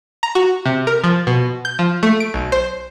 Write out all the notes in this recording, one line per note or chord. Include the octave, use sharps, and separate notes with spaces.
A#5
F#4
C3
A#4
F3
B2
G6
F3
A3
D7
B1
C5